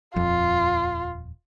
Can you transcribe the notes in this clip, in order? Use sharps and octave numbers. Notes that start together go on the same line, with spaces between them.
D#1 F2 F4